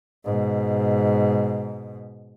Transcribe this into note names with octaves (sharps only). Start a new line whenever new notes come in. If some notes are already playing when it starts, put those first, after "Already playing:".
G#2 B2